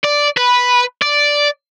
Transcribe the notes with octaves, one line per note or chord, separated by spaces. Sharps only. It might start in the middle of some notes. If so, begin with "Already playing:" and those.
D5
B4
D5